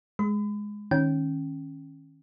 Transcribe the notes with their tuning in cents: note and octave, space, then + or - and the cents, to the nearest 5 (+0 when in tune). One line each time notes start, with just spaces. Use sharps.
G#3 +0 B5 +40
D#3 +0 C#4 -20 G5 -15